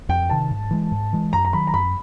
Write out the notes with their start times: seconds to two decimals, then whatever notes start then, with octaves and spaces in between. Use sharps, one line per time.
0.09 F2 G5
0.30 C3 D#3 A5
0.51 G#2
0.71 E3 G#3
0.92 G#2
1.13 E3 G#3
1.33 F#2 A#5
1.45 A#5
1.53 D#3 F#3 B5
1.67 A#5
1.74 F#2 B5